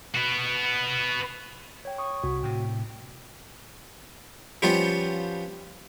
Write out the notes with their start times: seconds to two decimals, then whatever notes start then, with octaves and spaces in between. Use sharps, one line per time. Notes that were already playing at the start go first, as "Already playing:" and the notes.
0.15 B3 F#4
1.85 C#5 G5
1.98 C#6 D#6
2.23 C2 F#4
2.43 A2 C3 G5
4.62 F3 G3 B3 C#4 F4